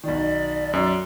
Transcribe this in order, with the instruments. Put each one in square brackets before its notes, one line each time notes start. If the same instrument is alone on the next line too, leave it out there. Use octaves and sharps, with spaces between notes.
[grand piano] B1 D#3 [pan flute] D5
[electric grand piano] F#2